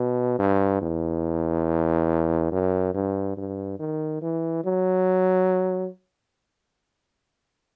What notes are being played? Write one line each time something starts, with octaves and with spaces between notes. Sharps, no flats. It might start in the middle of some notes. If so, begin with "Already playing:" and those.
Already playing: B2
G2
E2
F#2
G2
G2
D#3
E3
F#3